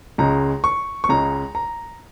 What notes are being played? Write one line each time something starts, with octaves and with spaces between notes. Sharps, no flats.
C#2 C#3 G#3 A#5
C#6
C#6
C#2 C#3 G#3 A#5
A#5